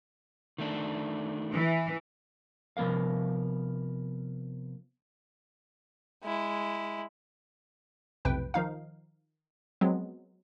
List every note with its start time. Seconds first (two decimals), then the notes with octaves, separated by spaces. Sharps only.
0.58 D#3 A3 D4
1.54 E3
2.77 C3 F3 B3 A#4 F5
6.24 G#3 E4
8.25 B1 F2 A2 C3 B4 G5
8.54 D#3 F3 D#4 F5
9.81 F3 F#3 G#3 B3 C4